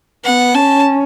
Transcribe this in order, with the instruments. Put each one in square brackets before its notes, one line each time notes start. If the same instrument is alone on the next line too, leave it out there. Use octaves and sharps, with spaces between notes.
[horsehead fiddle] B3 [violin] F#5
[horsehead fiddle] C#4 [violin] A5